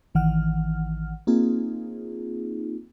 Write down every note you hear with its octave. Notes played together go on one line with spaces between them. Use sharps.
A1 D#3 E3 F#5 F6
A#3 C4 D#4 F4 G#4